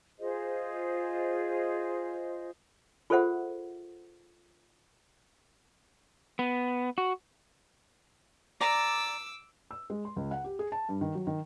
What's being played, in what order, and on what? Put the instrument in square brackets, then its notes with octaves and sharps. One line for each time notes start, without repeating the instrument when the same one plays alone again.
[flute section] F4 G#4 C5 D#5
[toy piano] F4 G#4 A4 C5 E5 F#5
[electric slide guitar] B3
F#4
[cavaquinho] D5 A#5 [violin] D6 E6
[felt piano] E6
G#3
C6
C#2
F#5
G4
G#4
A5
G2
D#3
F#3
D#3